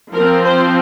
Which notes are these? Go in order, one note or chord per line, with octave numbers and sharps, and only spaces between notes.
F3 C4 A#4
C5